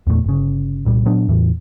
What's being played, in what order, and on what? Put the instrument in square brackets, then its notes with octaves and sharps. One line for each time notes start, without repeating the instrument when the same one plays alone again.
[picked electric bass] E2 A#2 G3 A3
G1 C#3
C2 A#2 G3
A#2 F#3 B3 D4
E2 A2 E3